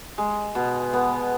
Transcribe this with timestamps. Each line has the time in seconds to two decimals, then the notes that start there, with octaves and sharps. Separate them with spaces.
0.18 G#3
0.55 B2
0.93 B3